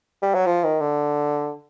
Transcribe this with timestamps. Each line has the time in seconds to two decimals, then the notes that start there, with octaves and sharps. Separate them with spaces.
0.22 G3
0.35 F#3
0.46 F3
0.64 D#3
0.81 D3